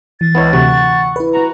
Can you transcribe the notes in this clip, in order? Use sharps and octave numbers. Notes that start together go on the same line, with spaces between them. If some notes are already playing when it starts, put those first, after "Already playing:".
E3 A6
C#2 B3 E4 C#5
D2 C3 F#5 C#6
E4 B4
F#4 A#5